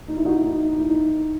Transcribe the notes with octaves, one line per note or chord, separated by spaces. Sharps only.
D#4
E4
D#4 F#4
E4
D#4
E4
D#4